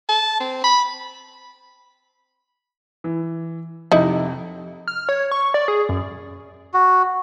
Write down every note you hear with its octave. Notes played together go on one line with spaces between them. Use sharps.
A5
C4
B5
E3
F2 C3 D#4 E4
F6
C#5
C#6
D5
G#4
F#2
F#4